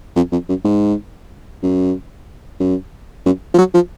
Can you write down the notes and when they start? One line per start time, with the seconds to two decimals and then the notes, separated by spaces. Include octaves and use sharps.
0.16 F2
0.32 F2
0.49 F#2
0.65 G#2
1.63 F#2
2.60 F#2
3.26 F#2
3.54 F3
3.58 F#3
3.74 F3